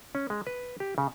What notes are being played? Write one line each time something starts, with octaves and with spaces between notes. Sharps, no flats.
C#4
G#3
B4
G4
C#3